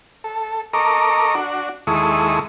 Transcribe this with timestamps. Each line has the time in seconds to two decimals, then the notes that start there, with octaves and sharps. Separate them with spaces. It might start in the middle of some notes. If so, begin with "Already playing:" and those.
0.24 A4
0.73 A4 A#4 D#5 A#5 C#6 D6
1.35 D4 F#4
1.87 D#2 G#3 E4 A4 C#6 D#6